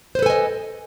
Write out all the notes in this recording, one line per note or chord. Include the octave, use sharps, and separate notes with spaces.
A4 B4 C5 D#5 G#5